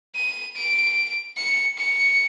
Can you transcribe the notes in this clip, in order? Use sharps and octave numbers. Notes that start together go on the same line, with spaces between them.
D#7
D7
C#7
C#7